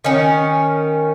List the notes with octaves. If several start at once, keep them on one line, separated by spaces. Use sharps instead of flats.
D#3 C#4